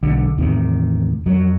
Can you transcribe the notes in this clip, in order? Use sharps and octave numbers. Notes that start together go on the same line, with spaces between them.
B1 D3
E2 A2 C3 D#3
F2 F#3